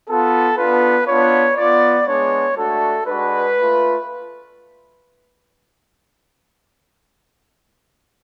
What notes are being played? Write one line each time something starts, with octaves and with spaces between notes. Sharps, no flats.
B3 F4 A4
B3 D4 F4 B4
B3 D4 F4 C#5
B3 F4 D5
G#3 B3 D4 C#5
A3 D4 F#4 A4
G#3 D4 F#4 B4
A3 F4